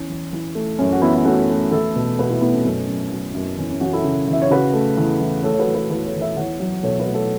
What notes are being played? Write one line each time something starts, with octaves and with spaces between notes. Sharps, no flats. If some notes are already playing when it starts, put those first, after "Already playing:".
Already playing: E2 C#4
E3
E3
A3
F#2 C#4
F#4
E3 B3 E4
E4
A3 C#4 F#4
A3
E2 E4 A4
B2
B2 F#4 B4
E4 A4
A3 B3 E4
C#4
F#2 C#4
F#2
F#3
F#2
E2 C#4
C#4
E3 C#4 F#4
E4 A4
C#3
E2 E5
C#5
C#3 F#4 B4
A3
E2
E3
A3 A4 C#5
C#5
F#4 B4
E3
F#4 B4
E2 F#4 B4
A4 C#5
E2
B4 E5
E2 C#5 F#5
F#3
B2 A4 C#5
F#4 B4
A3
A4 C#5